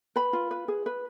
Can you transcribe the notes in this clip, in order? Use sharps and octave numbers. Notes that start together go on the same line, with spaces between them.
B4 B5
F4
B4
G#4
B4